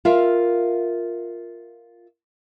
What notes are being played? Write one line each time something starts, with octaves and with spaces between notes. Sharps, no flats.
F4 A#4 E5 F5